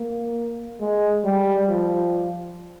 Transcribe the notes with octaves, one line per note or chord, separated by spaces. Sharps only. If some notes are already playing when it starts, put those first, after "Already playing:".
Already playing: A#3
G#3
G3
F3